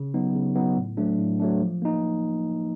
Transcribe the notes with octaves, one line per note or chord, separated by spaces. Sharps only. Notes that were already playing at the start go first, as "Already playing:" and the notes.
Already playing: C#3
F#3 B3 D#4
C#3
F#3 B3 D#4
A2
F#3 A3 D4
A2
F#3 A3 D4
F3
A#3 D#4